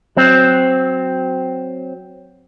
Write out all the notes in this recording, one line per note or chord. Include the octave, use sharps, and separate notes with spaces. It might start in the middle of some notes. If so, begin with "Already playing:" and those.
F#3 C4